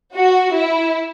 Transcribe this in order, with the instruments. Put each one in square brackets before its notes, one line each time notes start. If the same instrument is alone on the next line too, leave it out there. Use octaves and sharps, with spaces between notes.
[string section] F#4
E4